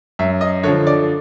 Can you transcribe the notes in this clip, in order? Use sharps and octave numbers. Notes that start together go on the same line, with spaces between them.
F#2 E5
D#5
D3 F3 C#5
D5